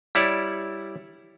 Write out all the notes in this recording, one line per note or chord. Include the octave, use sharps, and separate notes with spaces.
G3 E4 C#5 D5